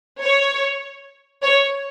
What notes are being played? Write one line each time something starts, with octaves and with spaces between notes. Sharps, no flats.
C#5
C#5